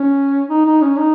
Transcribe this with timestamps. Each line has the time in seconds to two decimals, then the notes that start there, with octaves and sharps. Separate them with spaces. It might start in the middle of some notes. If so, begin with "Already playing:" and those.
Already playing: C#4
0.49 D#4
0.65 D#4
0.81 C#4
0.97 D#4